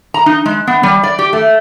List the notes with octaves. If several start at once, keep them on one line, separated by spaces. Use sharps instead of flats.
A#5
D#4
G#3
B3
G3
D5
G4
A3